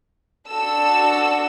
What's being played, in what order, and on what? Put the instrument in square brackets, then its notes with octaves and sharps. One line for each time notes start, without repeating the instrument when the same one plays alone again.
[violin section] D4 F#4 A4 E6